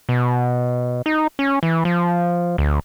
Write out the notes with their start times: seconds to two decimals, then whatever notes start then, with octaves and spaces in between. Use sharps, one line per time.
0.09 B2
1.06 D#4
1.39 C#4
1.63 E3
1.85 F3
2.58 D2